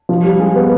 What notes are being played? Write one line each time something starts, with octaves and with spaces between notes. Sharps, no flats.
F3
G3
G#3
B3